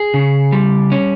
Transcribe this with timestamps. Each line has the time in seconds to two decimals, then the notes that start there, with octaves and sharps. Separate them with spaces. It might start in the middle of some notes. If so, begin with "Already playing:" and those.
Already playing: G#4
0.14 C#3
0.53 G3
0.92 C#4